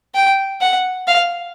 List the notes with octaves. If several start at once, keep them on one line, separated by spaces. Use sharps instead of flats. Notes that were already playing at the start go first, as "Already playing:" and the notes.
G5
F#5
F5